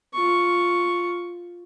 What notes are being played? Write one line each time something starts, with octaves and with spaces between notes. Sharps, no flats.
F4 C#6